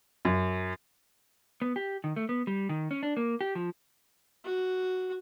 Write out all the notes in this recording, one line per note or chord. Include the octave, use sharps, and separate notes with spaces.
F#2
B3
G4
D#3
A3
B3
G3
D#3
C#4
D4
A#3
G4
F3
F#4